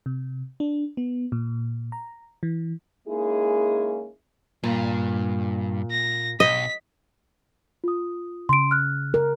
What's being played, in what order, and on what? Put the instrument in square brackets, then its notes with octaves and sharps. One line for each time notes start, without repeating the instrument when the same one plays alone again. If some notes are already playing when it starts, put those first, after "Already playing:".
[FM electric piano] C3
D4
B3
A#2
A#5
E3
[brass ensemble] G#3 A#3 C#4 D#4 E4 G#4
[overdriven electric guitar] G2 [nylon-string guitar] A#2
[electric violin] A#6
[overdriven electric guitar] B1 [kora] D#5 [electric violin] B6
[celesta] F4 D#6
[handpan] C#3 [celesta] C6 D7
[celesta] F6 F#6
[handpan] A#4